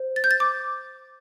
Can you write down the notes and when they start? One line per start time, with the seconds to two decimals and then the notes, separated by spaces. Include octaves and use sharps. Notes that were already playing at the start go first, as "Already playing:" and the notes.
Already playing: C5
0.16 A6
0.24 G6
0.31 A6
0.40 D6